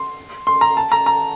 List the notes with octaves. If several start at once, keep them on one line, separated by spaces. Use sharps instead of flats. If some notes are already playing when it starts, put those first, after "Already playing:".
Already playing: C6
C6
A#5
A5
A#5
A#5